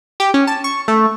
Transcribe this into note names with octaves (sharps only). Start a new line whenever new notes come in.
G4
C#4
A5
C#6
A3